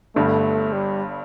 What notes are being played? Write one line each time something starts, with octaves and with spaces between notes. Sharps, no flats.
G1 G2 D3 A3
G3